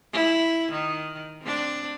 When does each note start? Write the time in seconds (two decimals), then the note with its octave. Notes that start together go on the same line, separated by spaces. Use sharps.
0.13 E4
0.72 D#3
1.42 C4 D4